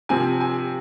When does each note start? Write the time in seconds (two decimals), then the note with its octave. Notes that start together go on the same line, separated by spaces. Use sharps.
0.09 C3 F3 C4 G#5
0.40 G#5